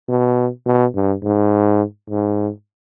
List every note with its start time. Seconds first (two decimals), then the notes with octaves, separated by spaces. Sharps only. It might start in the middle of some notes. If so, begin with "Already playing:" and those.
0.08 B2
0.65 B2
0.94 G2
1.22 G#2
2.09 G#2